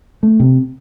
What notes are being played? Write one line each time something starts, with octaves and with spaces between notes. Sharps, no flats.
A3
C3